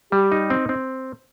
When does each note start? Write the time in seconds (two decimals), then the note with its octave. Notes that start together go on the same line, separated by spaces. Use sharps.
0.12 G3 G4
0.32 D#4
0.50 C4
0.69 C4